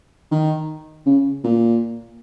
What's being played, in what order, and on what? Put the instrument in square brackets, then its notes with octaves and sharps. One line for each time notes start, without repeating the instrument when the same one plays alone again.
[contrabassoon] D#3
C#3
A#2